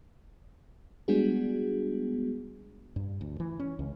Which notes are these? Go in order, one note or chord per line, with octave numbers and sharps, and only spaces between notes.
G3 G#3 B3 D4 F#4 G#4
G2
D2
E3
C#4
C#2